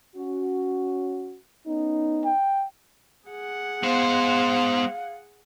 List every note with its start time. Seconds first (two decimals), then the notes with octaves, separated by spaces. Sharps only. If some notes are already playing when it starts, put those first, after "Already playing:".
0.16 C#4 F#4
1.67 B3 C#4 D#4
2.25 G5
3.28 G#4 F#5
3.83 G#3 B3 C5 F5